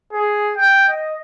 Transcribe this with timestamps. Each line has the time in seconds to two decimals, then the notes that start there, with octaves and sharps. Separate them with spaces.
0.13 G#4
0.57 G5
0.88 D#5